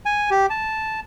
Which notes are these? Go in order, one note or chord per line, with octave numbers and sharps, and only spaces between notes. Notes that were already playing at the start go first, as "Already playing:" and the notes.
G#5
G4
A5